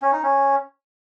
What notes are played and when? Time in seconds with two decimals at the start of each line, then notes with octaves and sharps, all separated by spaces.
0.02 C#4
0.13 D#4
0.23 C#4